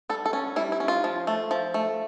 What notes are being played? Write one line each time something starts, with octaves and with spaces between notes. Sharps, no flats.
G3 A4
A4
C#4
G3 E4
E4
C#4
F4
F3
A3
F3
A3